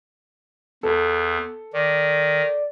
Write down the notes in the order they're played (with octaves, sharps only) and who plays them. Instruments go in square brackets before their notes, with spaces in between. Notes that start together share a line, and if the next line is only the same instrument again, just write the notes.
[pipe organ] E2 [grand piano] A4
[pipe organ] D#3 [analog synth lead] D5